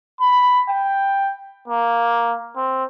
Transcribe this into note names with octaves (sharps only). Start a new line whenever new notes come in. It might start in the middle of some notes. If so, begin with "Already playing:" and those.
B5
G5
A#3
C4